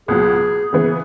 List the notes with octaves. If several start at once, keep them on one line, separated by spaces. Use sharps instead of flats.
C#2 B2 F#3 G#4
C#3 E3 B3 G#4